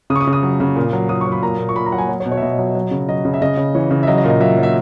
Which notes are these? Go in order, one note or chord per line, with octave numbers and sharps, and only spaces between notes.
C#3 D#6
C#6
D#6
C#3
D#6
F#3
C#3
A#2
F#3
F#3 D#6
C#6
F#3
B5
A#2 A#5
A#2
C#6
A#2 B5
A#5
F#3 F#5
G#5
F#3 C#5
C#5
B2
C#5
E5
B2 D#5
F#3
F#3
C#3
F#3 D#5
C#3
E5
C#3 D#5
C#3
E3 C#5
C#3
E5
F#3 D#5
D#5
A#2
D#5
F#3 E5
F#3
E5